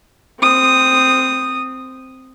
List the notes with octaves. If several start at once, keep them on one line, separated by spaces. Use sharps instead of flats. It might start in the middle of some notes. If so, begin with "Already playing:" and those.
C4 D#6